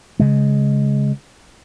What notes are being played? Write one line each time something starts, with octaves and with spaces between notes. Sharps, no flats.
C#3 G#3